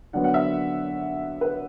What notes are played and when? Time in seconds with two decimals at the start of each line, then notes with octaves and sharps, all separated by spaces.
0.13 D3 F#3 B3 F#5
0.24 F#5
0.34 E5
1.41 B4